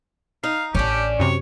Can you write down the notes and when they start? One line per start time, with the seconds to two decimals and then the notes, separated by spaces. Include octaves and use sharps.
0.44 D#4 F5
0.75 A1 C#4 D4 G4
1.19 F#2 C3 C#5